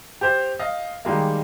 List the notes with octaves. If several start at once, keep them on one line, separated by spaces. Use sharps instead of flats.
G4 C5
D#5 F5
D#3 G3 G#3 A#3